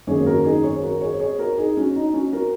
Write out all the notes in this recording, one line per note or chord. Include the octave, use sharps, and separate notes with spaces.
G#1 F#2 C#3 A#3 G#4 C#5
F#4 A#4
D#4 G#4
G#4 C#5
F#4 A#4
G#4 C#5
G#4 C#5
F#4 A#4
D#4 G#4
C#4 F#4
D#4
C#4 F#4
F#4 A#4